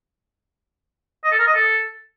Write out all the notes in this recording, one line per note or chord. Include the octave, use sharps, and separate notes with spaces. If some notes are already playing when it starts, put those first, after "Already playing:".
D#5
A4
A#4
D#5
A4